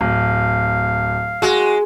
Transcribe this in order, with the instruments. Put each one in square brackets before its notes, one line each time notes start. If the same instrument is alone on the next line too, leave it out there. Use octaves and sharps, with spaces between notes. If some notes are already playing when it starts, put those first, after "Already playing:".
[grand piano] D1 [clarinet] F5
[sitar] G#3 [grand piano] F#4